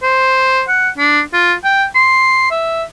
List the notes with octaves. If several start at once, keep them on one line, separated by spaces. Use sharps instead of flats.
C5
F#5
D4
F4
G5
C6
E5